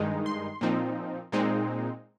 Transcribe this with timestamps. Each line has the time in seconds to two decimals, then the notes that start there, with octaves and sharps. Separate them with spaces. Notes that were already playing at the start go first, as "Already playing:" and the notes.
Already playing: G2 D#3 G#3 D#4
0.26 C6
0.61 A#2 F3 C4 D#4
1.32 A#2 G#3 C4 D#4